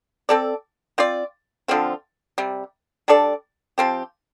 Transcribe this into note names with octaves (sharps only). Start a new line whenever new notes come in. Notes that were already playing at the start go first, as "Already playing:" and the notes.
C4 A4 D5
C4 F4 D5
D3 F3 C4 F4
C3 G3
G3 D4 A4 D5
F3 C4 G4